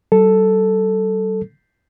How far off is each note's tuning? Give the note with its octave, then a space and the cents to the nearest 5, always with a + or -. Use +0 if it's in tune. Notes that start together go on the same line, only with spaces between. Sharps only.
G3 -45 A4 +0